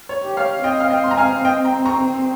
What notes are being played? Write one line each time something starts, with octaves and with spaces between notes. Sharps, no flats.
C#5
G4
C#5 F5
C4 D#5 G5
F5
D#5 G5
C6
A#5
F5 G#5
D#5 G5
G5 A#5
A#5 C#6